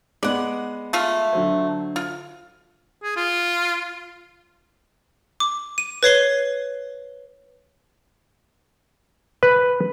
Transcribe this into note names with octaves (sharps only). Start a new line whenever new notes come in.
G#3 B3 D5 F#5
A3 F4 F5
D3 F#3 C5
F4
G#4
F4
D6
D#7
B4 C#5 C7 G7
B4